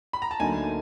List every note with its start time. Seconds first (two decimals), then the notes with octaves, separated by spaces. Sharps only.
0.13 B5
0.22 A#5
0.31 A5
0.39 D2 D3 F#3 A#3 D#4 G#5